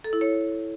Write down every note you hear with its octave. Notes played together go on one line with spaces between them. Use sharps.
A4
E4
C#5